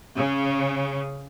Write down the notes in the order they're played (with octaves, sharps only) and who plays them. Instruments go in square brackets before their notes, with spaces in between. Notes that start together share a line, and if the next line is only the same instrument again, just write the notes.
[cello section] C#3